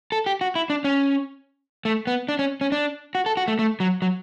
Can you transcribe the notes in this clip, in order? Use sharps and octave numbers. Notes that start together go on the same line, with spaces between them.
A4
G4
F#4
E4
D4
C#4
A3
B3
D4
C#4
C#4
D4
F#4
A4
F#4
A3
A3
F#3
F#3